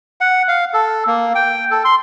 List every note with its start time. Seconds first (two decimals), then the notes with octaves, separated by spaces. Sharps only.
0.21 F#5
0.48 F5
0.74 A4
1.07 A#3
1.35 G5
1.71 A4
1.85 C6